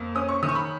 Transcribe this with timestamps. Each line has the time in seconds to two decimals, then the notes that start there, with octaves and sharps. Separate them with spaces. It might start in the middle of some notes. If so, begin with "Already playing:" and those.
Already playing: F2 A#3
0.15 C#4 D#6
0.29 C#6
0.43 D#3 D#6
0.49 C#6
0.55 B5